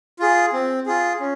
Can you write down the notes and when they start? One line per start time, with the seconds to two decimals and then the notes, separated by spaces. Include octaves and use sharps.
0.19 F4 G#4
0.53 C4
0.86 F4 G#4
1.20 C#4